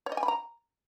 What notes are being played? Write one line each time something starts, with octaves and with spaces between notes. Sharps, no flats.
C#5
D#5
G#5
B5
A#5